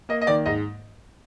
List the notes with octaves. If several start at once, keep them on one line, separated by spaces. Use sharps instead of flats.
A#3 D#5
D#5
D#3 D5
G#2 D#5